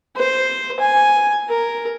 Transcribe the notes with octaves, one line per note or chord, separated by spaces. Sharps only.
C5
G#5
A#4